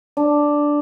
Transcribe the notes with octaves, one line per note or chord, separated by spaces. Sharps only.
D4